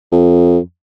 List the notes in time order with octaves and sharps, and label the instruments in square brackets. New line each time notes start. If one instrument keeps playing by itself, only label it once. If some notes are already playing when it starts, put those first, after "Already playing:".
[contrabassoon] F2